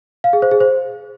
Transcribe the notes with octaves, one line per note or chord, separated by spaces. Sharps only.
F5
G#4
C5
G#4
C5